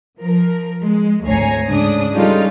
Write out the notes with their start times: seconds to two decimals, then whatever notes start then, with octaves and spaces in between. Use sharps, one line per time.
0.19 F3 A#4
0.83 G#3
1.26 G#1 D2 C#5 G#5 A#5 C7
1.68 G#2 C#3 D4 D#6
2.14 G3 G#3 C#4 D#4 F4 A4